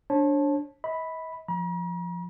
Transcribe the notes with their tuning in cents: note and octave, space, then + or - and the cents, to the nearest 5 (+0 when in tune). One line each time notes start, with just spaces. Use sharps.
D4 -10 C#5 -35 A5 -15
D#5 +45 B5 +0
F3 +0 A#5 +45